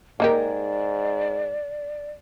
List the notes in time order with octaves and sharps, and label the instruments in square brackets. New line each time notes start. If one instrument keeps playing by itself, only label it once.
[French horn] G#2 [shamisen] A#3 D#4 G4 [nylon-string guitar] G#4 A#4 [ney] D5